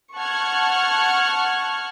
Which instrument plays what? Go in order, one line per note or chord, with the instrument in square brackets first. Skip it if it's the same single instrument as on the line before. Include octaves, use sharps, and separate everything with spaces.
[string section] F#5 A5 C#6 F6 F#6 G#6